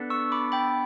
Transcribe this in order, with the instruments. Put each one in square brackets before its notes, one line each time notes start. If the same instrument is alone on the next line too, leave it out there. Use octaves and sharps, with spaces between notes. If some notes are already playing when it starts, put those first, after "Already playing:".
Already playing: [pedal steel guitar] B3 D4 A4
[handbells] C#6 E6
B5 D6
G5 B5